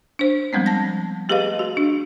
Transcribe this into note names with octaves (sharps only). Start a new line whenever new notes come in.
D4 C5
F3 G3 G#3 B3 C4
A5 A#6
A3 G4 G#4 B4 D#5 F5
F#4
D4